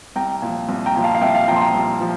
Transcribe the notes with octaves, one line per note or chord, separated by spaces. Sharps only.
C2 G5 A#5
A#2 F3
C2
G5 A#5
A#2 F3
F5 A5
F5
C2 E5 G5
F5 A5
A#2 F3 G5 A#5
C6
G5 A#5
C2
F3